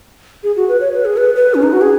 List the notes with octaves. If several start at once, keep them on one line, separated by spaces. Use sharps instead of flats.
G#4
F#4
B4
C#5
B4
G#4
B4
B4
C#4
D#4
F#4
G#4